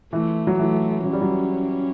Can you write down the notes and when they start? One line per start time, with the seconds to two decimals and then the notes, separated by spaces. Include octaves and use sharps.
0.13 E3 A3
0.47 F#3
0.59 E3 A3
1.04 F#3 C#4
1.13 G3
1.22 F#3